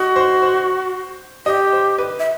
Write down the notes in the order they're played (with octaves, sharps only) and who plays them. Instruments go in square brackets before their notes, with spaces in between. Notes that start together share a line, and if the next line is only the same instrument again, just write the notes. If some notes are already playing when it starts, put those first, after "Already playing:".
Already playing: [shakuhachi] F#4 [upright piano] D#5
[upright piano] C5
C5
[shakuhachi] G4 [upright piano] D#5
[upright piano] C5
B4
[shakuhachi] E5